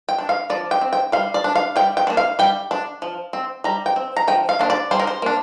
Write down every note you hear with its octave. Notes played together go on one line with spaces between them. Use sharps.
G5
D4
F5
F3 D5
G5
C4
G5
G3 F5
D5
D4
F5
G3 G5
G5
A#3 D4
F5
G3 G5
D4
F3
C4
G3 A#5
G5
C4
A#5
F3 G5
F5
A#3 D4 C5
D5
G3 C5
A#4
C5
A#3 D4